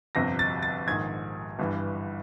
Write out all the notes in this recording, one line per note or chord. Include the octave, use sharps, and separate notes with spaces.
G1 F2 C3 A#6
A6
A6
A#1 G#2 D#3 G#6
G1 G2 E3